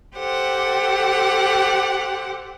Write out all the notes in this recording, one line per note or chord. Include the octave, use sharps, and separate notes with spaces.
G4 A4 C5 F#5